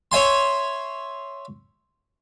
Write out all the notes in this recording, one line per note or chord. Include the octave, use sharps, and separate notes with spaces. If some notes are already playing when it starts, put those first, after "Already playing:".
C#5 E5 G#5 C6